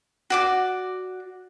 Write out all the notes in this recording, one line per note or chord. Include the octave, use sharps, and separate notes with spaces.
F#4 D5 D6